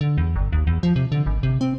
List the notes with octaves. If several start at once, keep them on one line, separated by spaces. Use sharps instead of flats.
D3
E2
G1
D#2
E2
F3
C3
D3
G#1
C3
C4